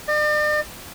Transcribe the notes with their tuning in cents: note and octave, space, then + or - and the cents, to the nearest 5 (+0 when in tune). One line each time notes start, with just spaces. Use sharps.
D5 +45